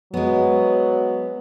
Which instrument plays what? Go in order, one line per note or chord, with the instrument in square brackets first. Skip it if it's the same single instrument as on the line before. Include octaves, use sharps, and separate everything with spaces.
[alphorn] F#3 [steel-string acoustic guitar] G#3 B3